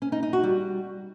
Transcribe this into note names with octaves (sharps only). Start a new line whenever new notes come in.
C#4
D#4
D#4
F#4
G3